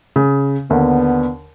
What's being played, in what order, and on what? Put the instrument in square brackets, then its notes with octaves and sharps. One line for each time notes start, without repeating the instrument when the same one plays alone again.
[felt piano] C#3
[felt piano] D#2 D3 [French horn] B3